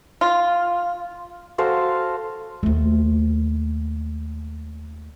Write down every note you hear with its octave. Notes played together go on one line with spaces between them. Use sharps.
F4
F#4 A4 C5 F5
D#2 A3